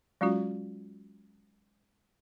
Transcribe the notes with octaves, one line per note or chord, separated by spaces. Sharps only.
F#3 G#3 C#4 F4 F#4